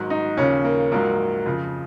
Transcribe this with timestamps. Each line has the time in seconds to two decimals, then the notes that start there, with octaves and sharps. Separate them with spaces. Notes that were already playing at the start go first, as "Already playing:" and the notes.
Already playing: G#1 G#2 F#3
0.10 D#4
0.37 D#2 C#3 F3 C#4
0.64 A#3
0.92 A#1 G#2 F#3 A#3
1.46 F2 C#3 F3